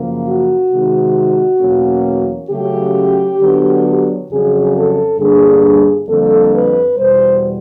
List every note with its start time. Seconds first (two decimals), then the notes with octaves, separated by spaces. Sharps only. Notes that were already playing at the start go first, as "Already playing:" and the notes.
Already playing: F#2 C#3 F3 A#3
0.26 F#4
0.70 C3 D#3 G#3 C4
1.61 E2 B2 F#3 A#3 C#4
2.50 C#3 F#3 A3 C#4 G4
3.40 D3 F#3 B3 D4
4.29 F2 C#3 F#3 G#4
4.74 A4
5.18 G2 D3 G3 A#3 D4 G#4
6.08 F2 D3 G3 A#3 A4
6.53 B4
6.97 E2 B2 G3 C5